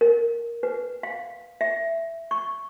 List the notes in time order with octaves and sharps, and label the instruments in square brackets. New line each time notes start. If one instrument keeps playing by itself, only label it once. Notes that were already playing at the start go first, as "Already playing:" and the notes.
[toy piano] A#4
B4
F5
E5
C#6